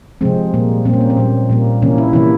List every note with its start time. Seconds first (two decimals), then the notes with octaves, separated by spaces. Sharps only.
0.21 C3 F3 G#3 C4
0.54 A#2 G3 A#3
0.85 A#2 G3 A#3 C4
0.93 C#4
1.01 A#3
1.10 C4
1.17 A#2 G3 A#3
1.49 A#2 G3 A#3
1.82 C3 E3 A#3 C#4
1.98 E4
2.13 C3 E3 A#3 E4